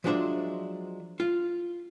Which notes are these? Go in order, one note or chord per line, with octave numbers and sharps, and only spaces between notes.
F3 F#3 G#3 D4 C5 E5
F4